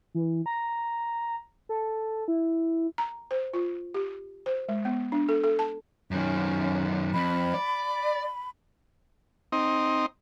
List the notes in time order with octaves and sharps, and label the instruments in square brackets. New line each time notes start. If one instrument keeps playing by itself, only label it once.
[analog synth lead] E3
A#5
A4
E4
[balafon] A#5
C5
F4
G4
C5
G#3
B3
D4
A4
A4
A5
[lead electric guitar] F#2 D#3 [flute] C#4
[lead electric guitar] F2 [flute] B5
[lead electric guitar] D5
[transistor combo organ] C4 D#4